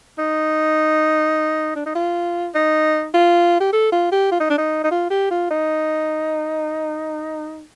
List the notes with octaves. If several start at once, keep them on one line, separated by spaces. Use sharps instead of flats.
D#4
D4
D#4
F4
D#4
F4
G4
A4
F4
G4
F4
D#4
D4
D#4
D#4
F4
G4
F4
D#4